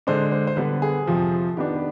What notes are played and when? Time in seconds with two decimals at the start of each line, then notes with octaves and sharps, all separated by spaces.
0.07 D3 G#3 D4 C5
0.32 C5
0.47 C5
0.56 D3 G3 B3 B4
0.82 G#4
1.07 F2 C3 F3
1.57 D#3 B3 D4 G4
1.76 B4